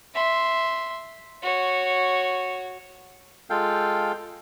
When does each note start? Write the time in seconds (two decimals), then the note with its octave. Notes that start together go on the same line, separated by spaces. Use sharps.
0.15 E5 C6
1.43 F#4 C#5
3.50 G#3 F4 A4 F5 G5